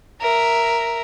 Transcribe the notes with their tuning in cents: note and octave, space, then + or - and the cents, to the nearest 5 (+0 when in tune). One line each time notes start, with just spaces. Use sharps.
A#4 +0 E5 +5